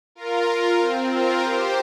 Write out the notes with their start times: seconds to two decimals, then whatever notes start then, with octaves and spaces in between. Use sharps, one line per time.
0.15 F4 A#4
0.79 C4
1.12 F4 A#4
1.43 G4 C5